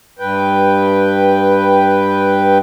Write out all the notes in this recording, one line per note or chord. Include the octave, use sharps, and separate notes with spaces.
G2 B4 G5